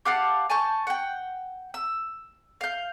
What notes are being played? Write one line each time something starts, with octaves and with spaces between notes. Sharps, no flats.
G4 F5 F#5 A5
G#5 A5 C#6 G6
F#5 G5
E6
F5 G6